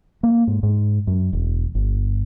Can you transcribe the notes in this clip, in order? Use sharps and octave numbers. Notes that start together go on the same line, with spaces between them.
A#3
G#2
G#2
F#2
E1
G1